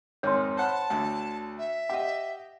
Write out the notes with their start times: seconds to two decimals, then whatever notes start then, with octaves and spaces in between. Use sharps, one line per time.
0.23 F2 G#2 D#3 C#5 C6
0.57 C5 F#5 A5 B5
0.90 D2 D3
1.58 E5
1.90 G4 D#5 F#5